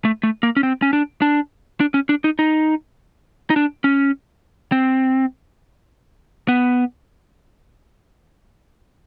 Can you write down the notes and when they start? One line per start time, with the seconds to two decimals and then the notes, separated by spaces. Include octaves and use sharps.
0.05 A3
0.23 A3
0.43 A#3
0.57 C#4
0.63 C4
0.82 C#4
0.93 D4
1.22 D4
1.80 D4
1.94 C#4
2.09 D4
2.24 D#4
2.39 D#4
3.50 D#4
3.56 D4
3.84 C#4
4.72 C4
6.48 B3